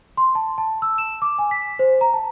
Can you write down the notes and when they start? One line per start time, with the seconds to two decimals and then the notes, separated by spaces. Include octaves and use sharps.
0.17 C6
0.35 A5
0.58 A5
0.82 E6
0.98 E7
1.22 D6
1.39 G#5
1.51 B6
1.79 C5
2.01 A#5
2.14 A5